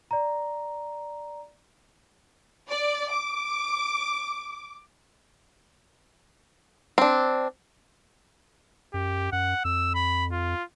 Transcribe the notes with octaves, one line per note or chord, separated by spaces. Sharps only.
D5 A#5
D5
D6
C4 D4
F#2 G4
F#2 F#5
F2 E6
B5
F4